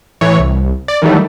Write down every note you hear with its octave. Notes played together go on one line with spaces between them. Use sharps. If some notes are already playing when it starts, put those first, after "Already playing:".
A2 E3 C#5
C2
D5
D#3 E3 F#3 G3 A3